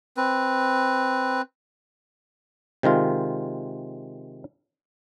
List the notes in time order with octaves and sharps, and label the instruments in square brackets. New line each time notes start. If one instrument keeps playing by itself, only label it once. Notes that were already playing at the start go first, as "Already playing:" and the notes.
[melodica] C4 B4
[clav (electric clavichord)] C3 D#3 G#3 F4